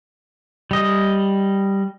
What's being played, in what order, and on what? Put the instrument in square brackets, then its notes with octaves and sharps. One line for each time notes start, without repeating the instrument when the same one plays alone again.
[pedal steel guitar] G3 D#5